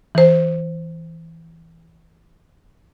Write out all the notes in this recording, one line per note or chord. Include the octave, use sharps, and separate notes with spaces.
E3 C5